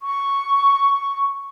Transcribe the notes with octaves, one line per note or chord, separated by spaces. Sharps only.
C#6